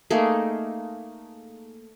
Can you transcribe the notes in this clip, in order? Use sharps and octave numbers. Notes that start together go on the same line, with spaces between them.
A3 A#3 D#4 G#4